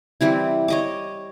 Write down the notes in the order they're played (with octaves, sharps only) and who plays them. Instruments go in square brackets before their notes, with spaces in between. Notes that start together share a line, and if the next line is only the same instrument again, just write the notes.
[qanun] E3 G3 C4 E4
C#5 D#5 D6